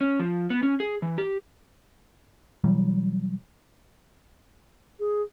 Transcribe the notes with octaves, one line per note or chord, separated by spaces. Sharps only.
C#4
F3
B3
C#4
G#4
E3
G4
B2 E3 F#3 G3
G#4